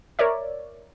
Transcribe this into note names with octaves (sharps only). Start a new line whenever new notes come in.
A#4 C#5 D5 E5